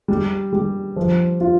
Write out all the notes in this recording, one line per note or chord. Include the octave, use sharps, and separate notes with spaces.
G3
G3
F3
F4